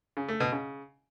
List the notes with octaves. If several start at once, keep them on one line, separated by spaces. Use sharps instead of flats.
C#3
A3
B2
C#3